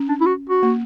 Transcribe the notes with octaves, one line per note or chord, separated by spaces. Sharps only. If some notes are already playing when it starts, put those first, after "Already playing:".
Already playing: C#4
D4
E4
F#4
F#4
A#3